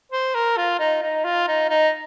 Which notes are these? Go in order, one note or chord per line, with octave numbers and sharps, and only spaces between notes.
C5
A#4
F4
D#4
D#4
F4
D#4
D#4